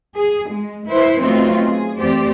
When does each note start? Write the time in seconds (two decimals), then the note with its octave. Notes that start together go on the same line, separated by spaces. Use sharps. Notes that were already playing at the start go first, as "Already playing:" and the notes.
0.16 G#4
0.49 G#3
0.87 E4 B4 C5
1.21 F#3 A3 B3 C4 D#4 F4
1.64 G#4
1.97 E2 A3 C4 G4 C5 D5